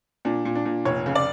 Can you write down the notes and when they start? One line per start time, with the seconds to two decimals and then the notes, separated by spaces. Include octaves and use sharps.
0.25 A#2 D4
0.45 A#2
0.55 D4
0.65 A#2
0.85 F1 C#5
1.06 C#3
1.15 D5